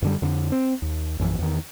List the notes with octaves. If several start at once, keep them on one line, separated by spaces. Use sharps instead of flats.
F#2 D3 G3
F2 D3
C4
D#2
A#1 F#2 E3
E2 D#3